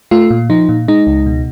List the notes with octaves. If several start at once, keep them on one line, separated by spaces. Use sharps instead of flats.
A3 F4
A#2
F3 D#4
A#2
G#3 D#4
C#2
B2